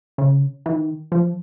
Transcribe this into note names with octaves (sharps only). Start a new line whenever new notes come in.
C#3
E3
D#3
F3